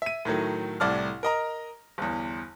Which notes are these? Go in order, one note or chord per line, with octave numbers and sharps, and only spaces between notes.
E5 D#7
A2 D#3 F#3 A3
C2 A2 D5 A5 F6
A#4 D#5 A#5
G1 E2